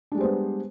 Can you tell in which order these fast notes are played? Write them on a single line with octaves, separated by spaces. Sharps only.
D4 G#3 G3 C5 B3